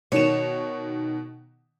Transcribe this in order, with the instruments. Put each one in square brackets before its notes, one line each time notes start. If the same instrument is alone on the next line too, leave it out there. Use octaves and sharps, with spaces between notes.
[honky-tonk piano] B2 D#3 E7 [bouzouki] C#5